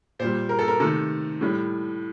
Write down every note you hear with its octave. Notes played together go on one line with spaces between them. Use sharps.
A#2 G3 C5
A#4
A4
A#4
C3 D#3 A3 A4
A2 G3